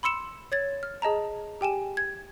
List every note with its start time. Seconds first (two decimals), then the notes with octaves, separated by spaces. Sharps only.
0.03 B5 C6 E6 C#7 E7
0.52 C#5 G#6 A6
0.83 F6
1.02 G#4 D#5 A5 A#5
1.61 G4 G5 G#5 E7
1.97 G#6